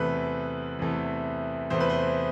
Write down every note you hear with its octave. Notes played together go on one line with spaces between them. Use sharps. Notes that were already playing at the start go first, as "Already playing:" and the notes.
Already playing: E2 C3 E3 A3 B4
E2 C3 E3 A3
E2 C3 E3 A3 C5
B4
C5